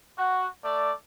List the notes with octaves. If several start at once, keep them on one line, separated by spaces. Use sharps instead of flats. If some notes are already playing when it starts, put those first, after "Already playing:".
F#4
A3 D5